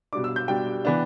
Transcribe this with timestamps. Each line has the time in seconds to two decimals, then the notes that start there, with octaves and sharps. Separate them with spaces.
0.13 B2 G3 D4 D6
0.24 E6
0.36 G6
0.48 B2 G3 D4 G5
0.85 E3 B3 D4